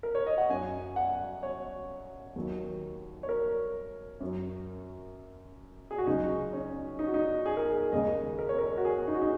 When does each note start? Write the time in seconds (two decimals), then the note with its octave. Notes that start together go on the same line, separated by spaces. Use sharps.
0.03 A#4
0.15 C#5
0.26 D#5
0.38 F#5
0.50 F#2 F#3 G#5
0.96 F#5
1.43 C#5
2.36 D#2 D#3 F#3
3.23 C#5
3.29 A#4
4.20 F#2 F#3
5.91 G#4
5.98 F#4
6.07 C#2 C#3 F#3 D#4
6.53 C#4
6.99 D#4
7.07 F#4
7.14 D#4
7.46 G#4
7.57 A#4
7.68 G#4
7.92 D#2 C#3 G#3 D#5
8.39 A#4
8.49 C#5
8.59 A#4
8.77 F#4
8.85 G#4
9.07 D#4
9.14 F#4
9.22 D#4